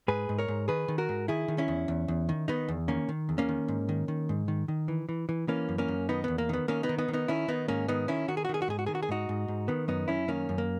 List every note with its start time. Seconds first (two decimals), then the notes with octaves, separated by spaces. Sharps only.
0.08 G#2 G#4 B4
0.29 G#2
0.38 A#4 C#5
0.48 G#2
0.68 D#3 G#4 B4
0.88 D#3
0.98 F#4 A#4
1.09 G#2
1.28 D#3 E4 G#4
1.48 D#3
1.58 C#4 E4
1.68 E2
1.88 E2
2.08 E2
2.29 D#3
2.48 D#3 B3 D#4
2.68 E2
2.88 D#3 A#3 C#4
3.09 D#3
3.29 E2
3.38 A#3 C#4
3.49 D#3
3.68 G#2
3.89 D#3
4.08 D#3
4.29 G#2
4.48 D#3
4.68 D#3
4.88 E3
5.09 E3
5.29 E3
5.48 E3 A#3 C#4
5.69 F#2
5.78 A#3 C#4
5.88 F#2
6.09 D#3 B3 D#4
6.24 E2 B3
6.38 A#3
6.49 D#3 B3
6.68 D#3 A#3 C#4
6.83 B3 D#4
6.89 D#3
6.98 B3 D#4
7.08 D#3
7.13 B3 D#4
7.28 D#3 C#4 E4
7.48 D#3 B3 D#4
7.68 G#2 A#3 C#4
7.88 D#3 B3 D#4
8.08 D#3 C#4 E4
8.28 D#3 F#4
8.37 G#4
8.45 F#4
8.49 D#3 G#4
8.62 F#4
8.68 G#2 G#4
8.79 F#4
8.86 D#3 G#4
8.95 F#4
9.03 G#4
9.09 G#2 D#4 F#4
9.29 G#2
9.48 G#2
9.68 D#3 B3
9.88 F#2 B3 D#4
10.08 F#2 C#4 E4
10.28 D#3 A#3 C#4
10.49 F#2
10.58 A#3